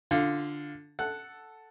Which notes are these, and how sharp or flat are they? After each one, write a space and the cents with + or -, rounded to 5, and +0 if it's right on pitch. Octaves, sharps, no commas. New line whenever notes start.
D3 +0 F4 +0
A4 +0 F#5 +0